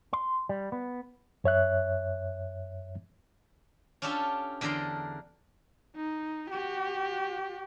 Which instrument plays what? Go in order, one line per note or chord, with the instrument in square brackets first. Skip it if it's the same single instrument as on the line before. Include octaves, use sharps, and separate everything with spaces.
[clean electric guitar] C6
G3
B3
[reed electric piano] F#2 C#5 E5 F#6
[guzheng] C#4 D4 F4 G4 A4 A5
E2 D3 A4 A#4 D5 C6
[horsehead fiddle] D#4
F#4 G4